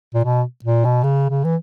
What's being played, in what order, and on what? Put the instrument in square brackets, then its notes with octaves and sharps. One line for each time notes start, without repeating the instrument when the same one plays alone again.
[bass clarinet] A#2
B2
A#2
B2
C#3
C#3
E3